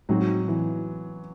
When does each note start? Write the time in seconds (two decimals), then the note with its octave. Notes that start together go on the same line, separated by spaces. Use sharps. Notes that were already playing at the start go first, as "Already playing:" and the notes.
0.09 A2 F#3 G#3 C4 D#4 F#4
0.48 E3